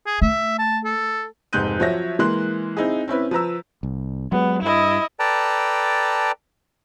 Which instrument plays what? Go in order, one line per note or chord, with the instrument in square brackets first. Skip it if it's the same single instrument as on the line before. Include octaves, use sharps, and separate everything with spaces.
[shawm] G#4
[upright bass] A3 [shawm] E5
[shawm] A5
A4
[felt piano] F1 F2 G#2 F#6 G6 D#7
F3 F#3 C#5 E5 A#6
E3 G#3 A#3 C6 F#6
C4 D#4 E4 G#4
C4 C#4 E4 B4
F3 B4 A#5 E6
[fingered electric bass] C2
[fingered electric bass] F#3 G#3 [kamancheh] B3
[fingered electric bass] G2 [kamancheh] E4 D#5
[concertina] A4 B4 D5 G5 A5 A#5